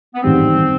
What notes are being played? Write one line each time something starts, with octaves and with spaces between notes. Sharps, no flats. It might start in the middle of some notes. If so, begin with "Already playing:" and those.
B3
A1 G#2 D#3 G3 C4
D#3 G3